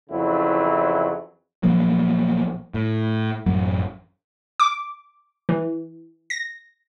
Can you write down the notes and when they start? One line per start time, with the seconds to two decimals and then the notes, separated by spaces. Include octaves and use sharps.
0.10 F2 C#3 E3 F#3 E4
1.63 A#1 F3 F#3 A#3
2.74 A2
3.46 A1 F#2 F#3
4.60 D6
5.49 E3
6.30 A#6